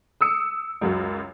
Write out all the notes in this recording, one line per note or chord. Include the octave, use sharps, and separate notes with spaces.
D#6 E6 C#7
C#2 F#2 F#4